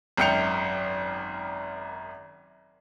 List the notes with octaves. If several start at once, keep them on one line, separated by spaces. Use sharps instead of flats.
G#1 F#2 G5 G6 C#7 F7